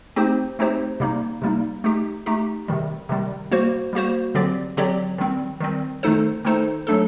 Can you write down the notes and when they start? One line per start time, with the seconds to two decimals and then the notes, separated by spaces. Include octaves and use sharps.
0.16 A3 C4 D#4 G4 C5
0.59 A3 C4 D#4 G4 C5
1.00 C3 G3 A#3 D#4
1.42 C3 G3 A#3 D#4
1.84 A3 D#4 G4
2.26 A3 D#4 G4
2.68 C3 D#3 G3
3.09 C3 D#3 G3
3.52 G3 A#3 F#4 C5
3.93 G3 A#3 F#4 C5
4.35 D3 F#3 C4 G4 D5
4.77 D3 F#3 C4 G4 D5
5.18 D#3 G3 C4
5.60 D#3 G3 C4
6.03 D#3 A3 D#4 A4 C5
6.45 D#3 A3 D#4 A4 C5
6.87 F#3 A3 D4 A4